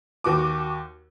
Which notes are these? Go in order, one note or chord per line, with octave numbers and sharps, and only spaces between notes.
D#2 F#4 D6